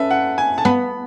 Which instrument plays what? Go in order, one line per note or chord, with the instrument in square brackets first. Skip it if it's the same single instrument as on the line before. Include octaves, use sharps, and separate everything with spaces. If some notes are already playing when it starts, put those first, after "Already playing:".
Already playing: [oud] C#4 [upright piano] A4 B4 E5
[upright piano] F#5
G#5
A5
[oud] B3 [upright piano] B5